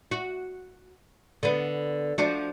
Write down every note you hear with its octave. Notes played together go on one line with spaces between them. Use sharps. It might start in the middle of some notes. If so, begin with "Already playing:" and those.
F#4
D3 B3
F3 D4 F#4